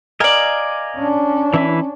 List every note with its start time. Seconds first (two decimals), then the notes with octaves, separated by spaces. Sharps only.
0.20 A#4 D5 D#5 F5 G#5
0.96 C#4 D4
1.54 E3 E4 B4